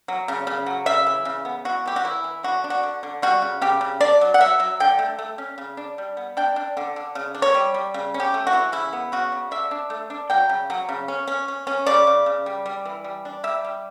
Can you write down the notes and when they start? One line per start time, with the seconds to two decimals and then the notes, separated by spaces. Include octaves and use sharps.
0.08 F#3
0.28 C#3
0.47 C#3
0.66 F#3
0.86 C#3 E5
1.07 E3
1.25 C#3
1.45 B3
1.65 E3 F#4
1.85 E3 G4
1.96 F#4
2.05 E3 E4
2.24 E3
2.43 D3 F#4
2.64 D4
2.70 F#4
2.83 D3
3.03 D3
3.22 G3 F#4
3.42 C#3
3.61 C#3 G4
3.81 C#3
4.00 D4 D5
4.21 F#3
4.34 F#5
4.40 F#3 E5
4.60 F#3
4.80 D3 G5
4.99 A3
5.19 A3
5.38 C#4
5.58 C#3
5.77 D4
5.98 G3
6.17 B3
6.37 D4 G5
6.56 D4
6.77 D3
6.96 D3
7.15 C#3
7.35 D4
7.42 C#5
7.54 G3
7.74 G3
7.94 C#3
8.14 C#4
8.20 G4
8.34 A3
8.47 F#4
8.53 E3
8.72 C#3 E4
8.93 B3
9.12 C#3 F#4
9.32 C#3
9.51 D3 E5
9.71 D4
9.90 A3
10.10 D4
10.30 F#3 G5
10.49 C#3
10.70 F#3
10.89 C#3
11.08 C#4
11.28 C#4
11.48 C#4
11.67 C#4
11.86 C#3 D5
12.07 C#3
12.26 C#3
12.46 G3
12.66 G3
12.85 E3
13.04 G3
13.25 D4
13.44 G3 E5
13.65 G3